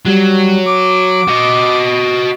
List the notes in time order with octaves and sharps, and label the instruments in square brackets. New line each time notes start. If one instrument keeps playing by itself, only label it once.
[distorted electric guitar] F#3 [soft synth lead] G3
[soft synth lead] D6
[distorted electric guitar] F#4 D#5